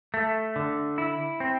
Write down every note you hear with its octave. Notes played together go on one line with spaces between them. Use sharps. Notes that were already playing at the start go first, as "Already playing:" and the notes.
A3
D3
E4
C4